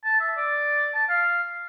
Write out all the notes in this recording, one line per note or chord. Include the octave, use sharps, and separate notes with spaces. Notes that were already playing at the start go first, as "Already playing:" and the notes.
A5
E5
D5
A5
F5